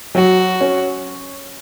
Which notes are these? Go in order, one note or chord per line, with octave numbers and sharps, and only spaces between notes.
F#3 F#4
C#4